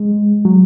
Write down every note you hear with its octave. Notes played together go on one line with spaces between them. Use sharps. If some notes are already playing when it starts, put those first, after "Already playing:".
Already playing: G#3
F#3